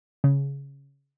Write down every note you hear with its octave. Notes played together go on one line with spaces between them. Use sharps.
C#3